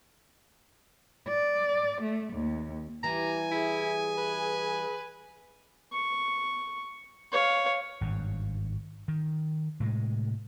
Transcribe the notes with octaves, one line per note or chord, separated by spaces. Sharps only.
D5
A3
D#2
E3 G3 G4 G#5 A#5
E4 G#4
B4
C#6
C#5 F5
G#1 G2
D#3
A2 C3 G#3